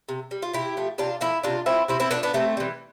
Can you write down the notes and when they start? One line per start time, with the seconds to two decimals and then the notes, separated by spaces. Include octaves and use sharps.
0.09 C3
0.31 G3
0.42 F4
0.53 C3 E4 G4
0.77 F3 A3
0.98 C3 D4 F4
1.21 F3 A3 C4 E4
1.43 C3 D4 F4
1.66 F3 A3 C4 E4
1.88 C3 C4 E4
2.00 C4 E4
2.11 F3 A3 B3 D4
2.23 B3 D4
2.34 C3 A3 C4
2.57 E3 G3